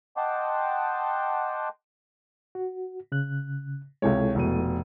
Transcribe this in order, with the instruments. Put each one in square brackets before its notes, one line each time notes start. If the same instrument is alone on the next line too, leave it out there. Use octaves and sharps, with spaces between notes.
[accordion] D#5 F#5 G5 A5 C6 D6
[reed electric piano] F#4
C#3 F#6
[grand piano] C#2 C3 C#5 [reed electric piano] G#3 E4 A4
[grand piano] F1 B2 D#7